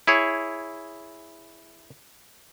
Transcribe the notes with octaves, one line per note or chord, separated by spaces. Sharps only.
E4 G#4 C#5